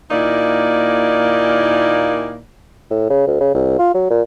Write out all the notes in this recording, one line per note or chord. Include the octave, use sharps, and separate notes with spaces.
D#2 A#2 A#3 D#4 E4 D5
A2
C#3
D2
C#3
C2
F4
F#3
A#2